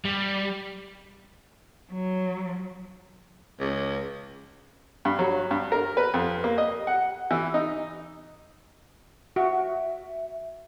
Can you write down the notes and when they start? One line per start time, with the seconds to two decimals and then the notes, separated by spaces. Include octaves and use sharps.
0.05 G3
1.91 F#3
3.60 C#2
5.05 G2
5.19 F#3
5.51 G2
5.72 A#4
5.97 B4
6.14 F2
6.44 A#3
6.58 D#5
6.87 F#5
7.31 E3
7.54 D#4
9.36 F#4 E5